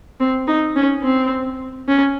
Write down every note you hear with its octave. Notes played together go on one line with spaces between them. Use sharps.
C4
D#4
C#4
C4
C#4